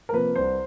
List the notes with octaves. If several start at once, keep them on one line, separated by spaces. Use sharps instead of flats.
A#4
C3 F3 A#3 B4
C2 C5